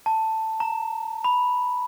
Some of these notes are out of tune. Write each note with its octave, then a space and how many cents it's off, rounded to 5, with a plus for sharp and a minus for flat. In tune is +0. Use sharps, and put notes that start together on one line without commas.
A5 +10
A#5 -15
B5 -5